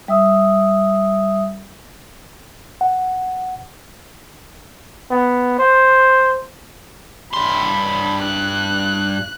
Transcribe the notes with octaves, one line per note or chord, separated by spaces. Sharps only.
G3 E5 D#6 E6
F#5
B3
C5
G2 B5 C6
F#6